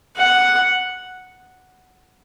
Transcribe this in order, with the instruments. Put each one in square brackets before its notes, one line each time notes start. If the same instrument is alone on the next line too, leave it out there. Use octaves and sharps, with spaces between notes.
[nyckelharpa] F#5